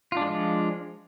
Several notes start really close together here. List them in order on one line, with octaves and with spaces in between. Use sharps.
F4 D4 G#3 F3